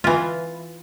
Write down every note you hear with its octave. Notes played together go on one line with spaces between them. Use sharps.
E3 F4